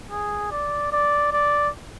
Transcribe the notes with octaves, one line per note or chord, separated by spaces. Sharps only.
G#4
D5
D5
D5